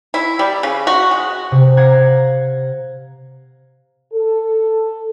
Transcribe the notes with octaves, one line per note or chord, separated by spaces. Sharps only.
E4
G3
C#3
F#4
G#3
C3
F5 F#5 A#5 G#6 A6
A4